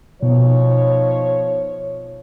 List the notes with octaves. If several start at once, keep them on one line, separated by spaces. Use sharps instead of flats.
B2 F3 D#4 C#5